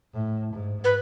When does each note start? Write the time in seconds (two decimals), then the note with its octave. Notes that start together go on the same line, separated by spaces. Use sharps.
0.13 A2
0.53 G#2
0.84 B4